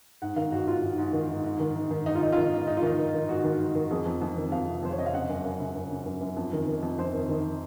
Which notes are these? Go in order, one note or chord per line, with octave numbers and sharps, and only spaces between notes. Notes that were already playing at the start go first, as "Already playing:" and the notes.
G#2 F#5
D#3 F5
G#2 F#4
G#2 F4
G#2
G#2
D#3
G#2
G#2
D#3
G#2
D#3
G#2 D#4
F4
D#3 D#4
F4
D#3 D#4
G#2
G#2 D#4
F4
D#3 D#4
D#3
D#3
G#2 F#4
D#3
G#2
D#3
F2 G#4
F2
F2
D#3
F2 F5
C3
F2 C5
C#5
C3 D#5
F5
C#3 F#5
F#2
F#2
C#3
F#2
C#3
F#2
F#2
F2
D#3
D#3
F2
F2 C5
D#3
D#3